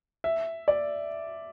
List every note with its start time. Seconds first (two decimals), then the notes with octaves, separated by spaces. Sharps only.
0.24 E5
0.68 D5